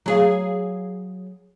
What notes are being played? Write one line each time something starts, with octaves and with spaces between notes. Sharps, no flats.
F#3 G#4 F5